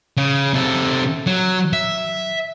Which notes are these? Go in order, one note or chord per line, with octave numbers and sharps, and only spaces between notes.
C#3
C3 A4
F#3
E5